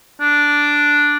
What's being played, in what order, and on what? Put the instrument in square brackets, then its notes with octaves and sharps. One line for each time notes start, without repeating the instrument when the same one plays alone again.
[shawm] D4